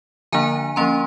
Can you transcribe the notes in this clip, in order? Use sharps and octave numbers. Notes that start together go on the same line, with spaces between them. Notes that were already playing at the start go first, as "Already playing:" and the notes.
D3 F3 A#3 D4 G#5 A#5
F3 A#3 C#4 A#5 C6